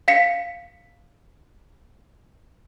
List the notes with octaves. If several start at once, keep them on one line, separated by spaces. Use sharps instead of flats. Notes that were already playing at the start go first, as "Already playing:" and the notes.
F5 B6 C#7